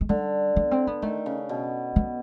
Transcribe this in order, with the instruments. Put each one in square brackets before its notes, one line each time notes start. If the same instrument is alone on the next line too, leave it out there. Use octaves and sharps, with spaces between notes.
[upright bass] G#3
[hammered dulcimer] D3 [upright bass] G3
[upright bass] B3
C4
B3
[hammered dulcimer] D#3 [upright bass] A3
[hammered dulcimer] C#3
B2
[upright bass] B3